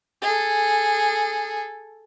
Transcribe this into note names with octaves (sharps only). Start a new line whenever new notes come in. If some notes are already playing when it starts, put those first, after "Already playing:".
G#4 A4